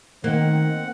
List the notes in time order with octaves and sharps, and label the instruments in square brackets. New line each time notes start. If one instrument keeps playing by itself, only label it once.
[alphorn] D#3 [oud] A#3 [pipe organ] C4 F#5